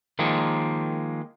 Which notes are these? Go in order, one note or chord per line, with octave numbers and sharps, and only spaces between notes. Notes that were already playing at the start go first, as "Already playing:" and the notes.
D#3 F3 G#3 A#3